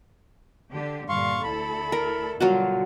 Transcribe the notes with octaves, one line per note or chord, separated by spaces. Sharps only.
D3 G4
G2 A#2 D3 F5 C6 C#6
D2 E4 A4 B5
A#4
B2 D3 F#3 G3 F4 F#4